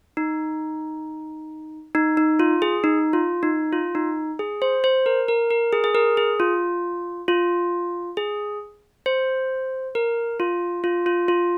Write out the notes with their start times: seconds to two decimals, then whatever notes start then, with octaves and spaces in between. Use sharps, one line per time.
0.17 D#4
1.95 D#4
2.17 D#4
2.39 F4
2.62 G#4
2.84 D#4
3.13 F4
3.43 D#4
3.73 F4
3.95 D#4
4.39 G#4
4.62 C5
4.84 C5
5.06 A#4
5.28 A#4
5.50 A#4
5.73 G#4
5.84 G#4
5.95 A#4
6.17 G#4
6.40 F4
7.28 F4
8.17 G#4
9.06 C5
9.95 A#4
10.40 F4
10.84 F4
11.06 F4
11.28 F4